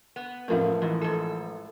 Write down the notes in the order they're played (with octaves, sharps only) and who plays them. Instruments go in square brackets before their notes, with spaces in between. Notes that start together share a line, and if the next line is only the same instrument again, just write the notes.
[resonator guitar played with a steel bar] B3
[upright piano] A1 F3 A3 [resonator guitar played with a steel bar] F2 G#2 [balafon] A#4 F5
[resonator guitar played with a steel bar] G#2 [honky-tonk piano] E3
[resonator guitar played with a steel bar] G#2 A4